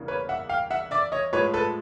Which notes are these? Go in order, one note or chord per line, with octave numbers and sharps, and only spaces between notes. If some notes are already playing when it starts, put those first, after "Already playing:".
Already playing: E2 C#3 E3 G3 A#3
B4 C#5
E5 F#5
F5 G5
E5 F#5
D5 E5
C#5 D#5
A2 F3 G#3 B4 C#5
A4 B4